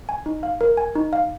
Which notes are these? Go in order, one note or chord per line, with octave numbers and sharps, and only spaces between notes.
G#5
D#4
F5
A#4
G#5
D#4
F5